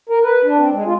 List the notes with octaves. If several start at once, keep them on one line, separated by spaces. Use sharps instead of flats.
A#4
B4
D4
C4
G#3
F4